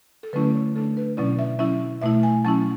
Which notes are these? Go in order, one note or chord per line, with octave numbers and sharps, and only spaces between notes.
A4
D3 F#3 A3 C#4 E4 B4
C#5
D3 A3 D4 A4
B4
B2 F#3 C#4 E4 D5
E5
F#3 C#4 E4 E5
B2 A3 E4 E5
G#5
F#3 C#4 E4 A5